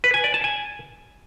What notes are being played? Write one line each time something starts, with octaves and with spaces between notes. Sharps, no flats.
B4
G#5
D5
A5
G#5